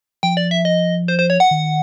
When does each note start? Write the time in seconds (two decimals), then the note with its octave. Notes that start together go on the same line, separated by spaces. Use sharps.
0.23 F3 G5
0.37 D5
0.51 E5
0.65 D#5
1.08 C5
1.19 C5
1.30 C#5
1.40 F#5
1.51 D#3